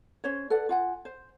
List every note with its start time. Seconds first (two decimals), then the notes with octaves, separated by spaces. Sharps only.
0.24 C#4 C5 C#5
0.50 A4 B4 D5 F#5
0.69 F4 F#5 G#5
1.05 C5